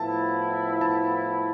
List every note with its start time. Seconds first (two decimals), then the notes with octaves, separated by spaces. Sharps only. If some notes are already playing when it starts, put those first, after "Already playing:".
Already playing: A2 F3 B3 E4 A5
0.81 A5